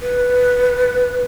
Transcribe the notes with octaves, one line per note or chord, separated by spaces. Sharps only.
B4